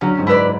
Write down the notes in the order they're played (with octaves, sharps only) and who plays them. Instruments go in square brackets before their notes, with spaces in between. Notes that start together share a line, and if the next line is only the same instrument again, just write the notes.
[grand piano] D3 F#3 [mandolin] C#4
[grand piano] G#2
[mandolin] E4 B4 D5